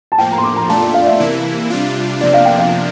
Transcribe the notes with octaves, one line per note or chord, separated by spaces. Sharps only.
A5
A2 F3 A#3 G5
A#5
C6
D6
A#5
A#2 A3 D4 F4 A5
F5
D5
E5
C3 E3 A#3 E4
C3 G3 D4 F4
C3 F3 A#3 D4 D5
F5
G5
F5